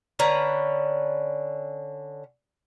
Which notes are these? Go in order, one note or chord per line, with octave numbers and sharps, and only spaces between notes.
D3 C#4 B4 A#5